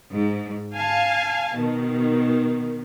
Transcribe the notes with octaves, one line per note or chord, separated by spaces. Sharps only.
G#2
F5 G#5 A5
B2 D#3